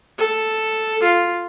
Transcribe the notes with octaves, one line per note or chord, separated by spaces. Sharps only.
A4
F4